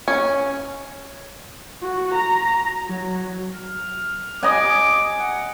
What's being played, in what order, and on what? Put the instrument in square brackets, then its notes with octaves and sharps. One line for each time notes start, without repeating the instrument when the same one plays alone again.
[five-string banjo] C#4
[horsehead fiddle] F#4
A#5
F#3
[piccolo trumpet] F6
[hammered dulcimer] D#5 G#5 [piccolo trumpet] D6
[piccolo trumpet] F#5